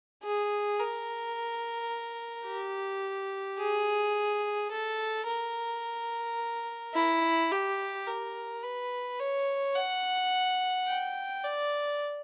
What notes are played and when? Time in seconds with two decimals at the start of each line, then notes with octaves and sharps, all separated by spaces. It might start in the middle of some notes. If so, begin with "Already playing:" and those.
0.23 G#4
0.79 A#4
2.47 G4
3.58 G#4
4.71 A4
5.28 A#4
6.95 E4
7.52 G4
8.07 A#4
8.63 B4
9.19 C#5
9.75 F#5
10.87 G5
11.44 D5